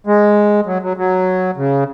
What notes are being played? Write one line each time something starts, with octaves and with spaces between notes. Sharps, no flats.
G#3
F#3
F#3
F#3
C#3